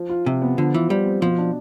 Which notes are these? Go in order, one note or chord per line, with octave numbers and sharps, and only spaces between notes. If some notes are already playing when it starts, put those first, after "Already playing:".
Already playing: F3
F4
C3 F3
B3
D3 F3
E3 F4
G3 C5
C4
B2 F3
D4